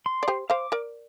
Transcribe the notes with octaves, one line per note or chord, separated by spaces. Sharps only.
C6
D5
G4 C5
C5 F5 D6
A#4 D5